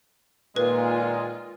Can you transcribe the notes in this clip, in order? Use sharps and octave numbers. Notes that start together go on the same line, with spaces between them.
A#2 D#3 G#3 F4 B4